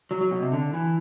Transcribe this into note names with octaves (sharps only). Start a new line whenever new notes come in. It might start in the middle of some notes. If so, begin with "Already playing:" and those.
F#3
F#3
B2
C3
D3
E3